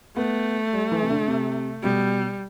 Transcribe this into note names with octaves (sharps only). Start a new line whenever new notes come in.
A3 B3
G3
E3
C3
D3
C3
B2 G3